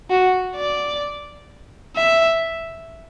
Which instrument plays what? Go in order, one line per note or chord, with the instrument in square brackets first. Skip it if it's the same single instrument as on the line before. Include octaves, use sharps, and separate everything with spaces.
[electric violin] F#4
D5
E5